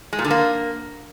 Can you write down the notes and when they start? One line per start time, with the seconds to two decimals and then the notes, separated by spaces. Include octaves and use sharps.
0.13 G#3
0.19 A#2
0.25 D3
0.31 A#3